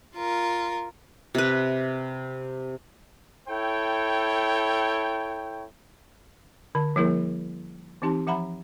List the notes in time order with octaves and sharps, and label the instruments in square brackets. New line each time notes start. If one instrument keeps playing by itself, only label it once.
[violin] F4 A#4
[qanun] C3 B4
[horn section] E4 A4 C#5 G5
[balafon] D3 A5
F3 G3 A#3 E4 G#4 A#4
E3 C4 D#4 G4 A5 C6
F3 E5 F#5 A#5 B5